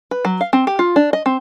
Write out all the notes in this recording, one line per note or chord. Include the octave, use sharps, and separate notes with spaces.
B4
F#3
F5
C4
G4
F4
D4
D#5
C4